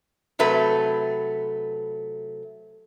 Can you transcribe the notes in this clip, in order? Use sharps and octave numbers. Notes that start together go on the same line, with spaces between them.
C3 F#3 A3 B4